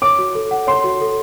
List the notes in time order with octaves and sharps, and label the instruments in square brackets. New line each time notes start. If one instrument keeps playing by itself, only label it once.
[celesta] C#5 [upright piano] D6
[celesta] F#4
A4
F#5
[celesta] C#5 [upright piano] C6
[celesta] F#4
A4